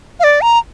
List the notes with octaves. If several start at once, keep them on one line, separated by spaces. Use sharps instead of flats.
F5
D5
A#5